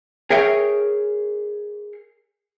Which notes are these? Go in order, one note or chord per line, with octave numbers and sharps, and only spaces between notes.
G#4 A#4 C#5 E5 G5